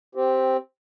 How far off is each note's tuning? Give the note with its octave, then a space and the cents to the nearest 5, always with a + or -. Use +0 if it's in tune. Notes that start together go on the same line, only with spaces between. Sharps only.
C4 +0 G4 -10